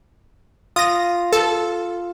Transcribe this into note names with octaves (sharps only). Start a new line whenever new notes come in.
F4 D#6 A#6
A4